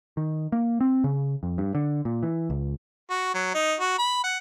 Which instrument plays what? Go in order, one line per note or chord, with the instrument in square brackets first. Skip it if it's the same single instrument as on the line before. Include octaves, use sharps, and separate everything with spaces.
[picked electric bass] D#3
A#3
C4
C#3
F2
G2
D3
A#2
E3
C#2
[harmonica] F#4
F#3
D#4
F#4
B5
F#5